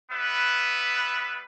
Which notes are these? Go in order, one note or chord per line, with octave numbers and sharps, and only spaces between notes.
G3 B3 B4 E5